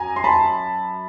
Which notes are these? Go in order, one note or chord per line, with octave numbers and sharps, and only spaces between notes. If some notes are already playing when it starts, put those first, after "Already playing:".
Already playing: F#2 G#5 A#5
C6
A5 B5